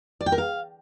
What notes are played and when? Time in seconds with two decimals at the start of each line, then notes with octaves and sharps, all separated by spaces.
0.21 D5
0.26 G5
0.32 A#4
0.38 F5